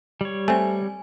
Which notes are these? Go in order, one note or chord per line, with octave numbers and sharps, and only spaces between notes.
G3 C#5
A3 C4 G#5